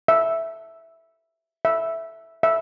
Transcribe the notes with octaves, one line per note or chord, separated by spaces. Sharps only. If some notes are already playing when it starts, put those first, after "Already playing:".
E5
E5
E5